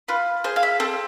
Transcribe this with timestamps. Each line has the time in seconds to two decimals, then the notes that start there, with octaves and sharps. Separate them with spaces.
0.08 F4 B4
0.44 G#4 C5
0.56 F5
0.63 E5
0.80 C4 A4